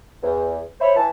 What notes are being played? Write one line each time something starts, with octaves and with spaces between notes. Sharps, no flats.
E2
C5 C#5 E5 B5
E3 A5